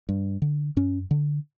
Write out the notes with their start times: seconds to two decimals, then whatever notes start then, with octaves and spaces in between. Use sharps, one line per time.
0.09 G2
0.42 D3
0.77 F#2 C#4
1.11 D3